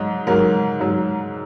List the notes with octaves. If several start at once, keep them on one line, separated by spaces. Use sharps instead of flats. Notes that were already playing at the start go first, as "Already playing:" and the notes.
Already playing: G#2 F#3 D#5
G#2 F#3 A#4
G#2 F#3